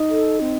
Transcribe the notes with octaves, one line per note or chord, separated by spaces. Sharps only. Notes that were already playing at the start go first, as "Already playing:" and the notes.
Already playing: D#4
A4
C4